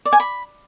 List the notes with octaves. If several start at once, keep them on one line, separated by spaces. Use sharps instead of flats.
D5
G#5
B5